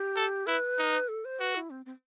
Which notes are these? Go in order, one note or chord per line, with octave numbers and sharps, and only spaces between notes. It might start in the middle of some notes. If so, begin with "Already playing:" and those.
Already playing: G4
A4
E4 B4
D#4
A4
C5
F#4 B4
E4
C4
C4